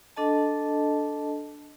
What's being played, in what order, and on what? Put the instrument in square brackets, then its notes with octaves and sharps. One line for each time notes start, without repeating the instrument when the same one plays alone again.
[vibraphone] D4 A4 D#5 A5